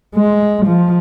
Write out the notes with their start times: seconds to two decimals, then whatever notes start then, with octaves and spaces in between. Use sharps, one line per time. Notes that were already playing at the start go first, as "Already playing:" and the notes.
0.15 G#3
0.66 F3